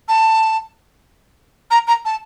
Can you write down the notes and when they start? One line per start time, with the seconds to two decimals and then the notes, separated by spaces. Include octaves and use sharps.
0.08 A5
1.71 A#5
1.87 A#5
2.05 A5